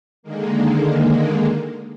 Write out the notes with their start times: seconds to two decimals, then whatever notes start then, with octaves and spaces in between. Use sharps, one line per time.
0.23 D3 D#3 G#3 A#3